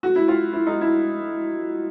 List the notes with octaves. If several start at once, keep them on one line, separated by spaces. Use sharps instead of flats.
F#4
E4
F4
E4
D#4
E4